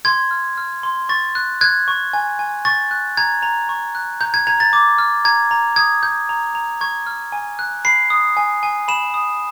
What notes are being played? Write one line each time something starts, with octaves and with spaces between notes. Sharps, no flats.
C6 G#6
F6
F6
C6
C#6 A6
F#6
F#6 G#6
C#6
G#5
G#5
C#6 A6
F#6
A#5 G#6
A#5
C#6
F#6
A#5 G6
G#6
A#5 G#6
A6
D6
F6
A#5 G#6
A#5
D#6 G#6
G6
A#5
A#5
C#6 G#6
F6
G#5
F#6
B5 C7
D#6
G#5
G#5
B5 E7
D#6